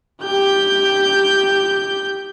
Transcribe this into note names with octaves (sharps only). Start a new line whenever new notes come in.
G4 G6